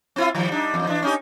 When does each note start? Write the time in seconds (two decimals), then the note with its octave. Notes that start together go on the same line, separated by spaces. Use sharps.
0.16 C4 E4 F4
0.35 D#3 F3 G3
0.50 G3 D4 D#4
0.74 E2
0.87 E3 D4
1.02 C#4 D#4 G4